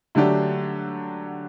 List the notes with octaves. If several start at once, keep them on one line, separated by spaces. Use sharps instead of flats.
D3 F#3 A3 D4 G4